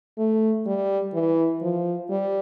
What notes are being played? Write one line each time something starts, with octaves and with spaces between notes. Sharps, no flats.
A3
G3
E3
F3
G3